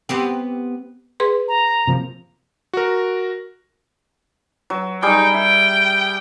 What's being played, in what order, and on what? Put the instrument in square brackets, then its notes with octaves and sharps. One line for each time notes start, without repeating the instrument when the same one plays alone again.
[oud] B3 C4 G4
[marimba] G#4 B4 C6
[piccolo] A#5
[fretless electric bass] C3 F3 A#3
[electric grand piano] F#4 A#4
[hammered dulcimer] F#3
[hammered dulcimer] G3 G#4 [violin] D#4 G5
[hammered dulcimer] E5 [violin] G5